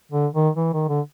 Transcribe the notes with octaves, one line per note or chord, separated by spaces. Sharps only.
D3
D#3
E3
D#3
D3